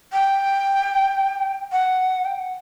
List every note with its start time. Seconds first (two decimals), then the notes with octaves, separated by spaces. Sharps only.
0.13 G5
1.72 F#5
2.25 G5
2.39 F#5